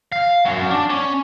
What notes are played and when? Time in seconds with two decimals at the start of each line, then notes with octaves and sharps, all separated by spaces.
0.12 F5
0.45 F#3 C#4
0.71 D4
0.90 C#4